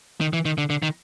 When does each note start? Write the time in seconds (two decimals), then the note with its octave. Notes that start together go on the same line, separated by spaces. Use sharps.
0.21 D#3
0.33 E3
0.45 D#3
0.58 D3
0.70 D3
0.82 D#3